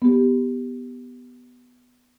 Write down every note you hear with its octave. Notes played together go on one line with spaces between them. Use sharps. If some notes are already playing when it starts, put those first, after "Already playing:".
B3 G4